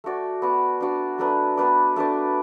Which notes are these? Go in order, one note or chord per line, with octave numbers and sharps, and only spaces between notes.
A3 F#4 D5
B3 F#4 D5
D4 F#4 D5
F#3 A3 D4 B4
B3 D4 B4 D5
A3 D4 B4 D5